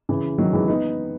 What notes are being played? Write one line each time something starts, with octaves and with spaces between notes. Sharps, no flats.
C#3 E3
D#3 F#3
E3 G#3
B3 D#4